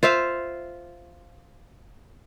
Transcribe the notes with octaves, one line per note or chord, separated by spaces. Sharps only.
F4 C5 E5 F5